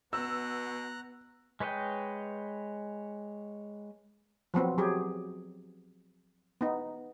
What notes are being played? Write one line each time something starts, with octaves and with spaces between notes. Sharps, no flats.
B2 B3 A#5 E6 F#6
G#3 B4 C#5 D#5 G5
F3 F#3 B3 C4
F#3 G4 G#4
B3 D#4